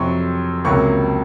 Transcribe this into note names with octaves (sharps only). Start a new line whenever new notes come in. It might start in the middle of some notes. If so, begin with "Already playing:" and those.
Already playing: F2 C3 F#3 C6 C#6
C#2 C3 F#3 A#3 C#6